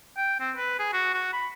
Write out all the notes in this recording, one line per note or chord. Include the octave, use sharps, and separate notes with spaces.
G5
C4
B4
G#4
F#4
F#4
B5